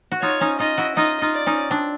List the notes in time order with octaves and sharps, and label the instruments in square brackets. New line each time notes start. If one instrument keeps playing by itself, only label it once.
[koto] F#4
[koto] D#4 F4 [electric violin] C#5
[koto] C#4 D#4
[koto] D#4 F4 [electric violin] D#5
[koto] E4 F#4
[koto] D#4 F4 [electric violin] D#5
[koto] D#4 F4
[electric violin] D5
[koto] C#4 D#4
C4 D4